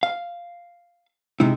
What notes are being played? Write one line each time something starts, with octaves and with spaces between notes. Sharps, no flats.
F5
C3 G#3 D#4 E4